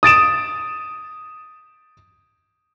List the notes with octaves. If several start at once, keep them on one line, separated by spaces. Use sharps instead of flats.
D#6 A6 D7 E7